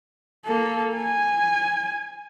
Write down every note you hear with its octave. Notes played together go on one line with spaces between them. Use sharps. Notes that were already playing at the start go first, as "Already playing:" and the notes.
A#3 A4
G#5